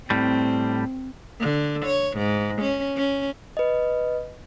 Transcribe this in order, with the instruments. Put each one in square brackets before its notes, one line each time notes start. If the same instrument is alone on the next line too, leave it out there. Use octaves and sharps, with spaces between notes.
[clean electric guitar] A2 G3 [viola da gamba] C4
[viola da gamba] D3
C#5
G#2
C#4
C#4
[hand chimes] B4 D#5